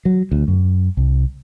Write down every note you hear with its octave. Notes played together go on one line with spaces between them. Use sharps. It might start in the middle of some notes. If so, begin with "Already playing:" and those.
F#3
D2
F#2
C2